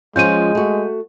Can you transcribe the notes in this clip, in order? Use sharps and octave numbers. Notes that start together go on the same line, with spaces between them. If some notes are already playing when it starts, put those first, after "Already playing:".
F3 G#3 C#4 F4 G6 D#7
A3 F#4